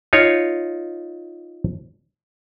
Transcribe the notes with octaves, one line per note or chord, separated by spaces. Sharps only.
D#4 F4 C#5